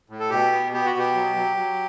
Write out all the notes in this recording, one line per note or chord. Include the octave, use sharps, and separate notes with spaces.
A2
A4
B2 G4
B3
B3 G4
F#4
B2
G4
F#3
F#3
F#3